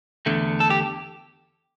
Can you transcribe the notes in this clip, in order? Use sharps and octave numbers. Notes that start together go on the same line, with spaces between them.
E2 D3 A3
A4
G4